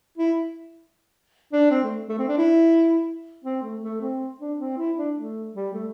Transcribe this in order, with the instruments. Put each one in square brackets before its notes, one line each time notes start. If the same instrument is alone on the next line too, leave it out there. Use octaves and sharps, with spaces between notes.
[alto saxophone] E4
D4
C4
A3
A3
C4
D4
E4
C4
A3
A3
C4
D4
C4
E4
D4
A3
G3
A3